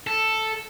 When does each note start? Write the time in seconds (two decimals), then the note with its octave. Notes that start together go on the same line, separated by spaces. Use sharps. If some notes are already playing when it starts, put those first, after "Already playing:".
0.07 A4